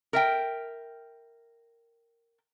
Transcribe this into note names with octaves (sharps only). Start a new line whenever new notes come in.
A#4 E5 G5